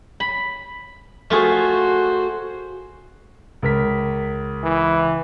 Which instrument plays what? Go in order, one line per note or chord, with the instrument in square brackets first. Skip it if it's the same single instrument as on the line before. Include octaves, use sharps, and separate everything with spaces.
[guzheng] B5
[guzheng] A3 F4 G#4 [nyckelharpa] F#4 C5
[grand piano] C#2 A#4 B6
[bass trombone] E3